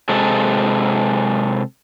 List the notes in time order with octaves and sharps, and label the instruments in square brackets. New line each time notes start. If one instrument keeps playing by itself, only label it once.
[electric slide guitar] C3 G#3 A4